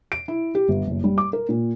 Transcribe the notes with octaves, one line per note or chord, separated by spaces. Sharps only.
D7
E4
G4
G1
F#1
G3
D6
A#4
A#2